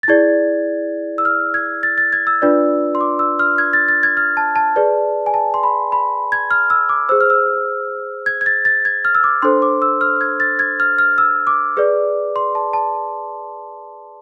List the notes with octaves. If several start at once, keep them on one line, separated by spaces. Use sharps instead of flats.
A6
E4 G#4 D5 G#6
E6
F6
G#6
A6
A6
G#6
E6
D4 F4 B4 D5
C6
D6
E6
F6
G#6
A6
A6
G#6
F6
A5
A5
G#4 B4 D5
G#5
A5
C6
B5
B5
G#6
F6
E6
D6
G#4 C5 E6
F6
E6
G#6
G#6
A6
A6
G#6
F6
E6
D6
D4 A4 C5 C6
D6
E6
F6
G#6
A6
G#6
F6
F6
E6
D6
G#4 B4 D5
C6
A5
A5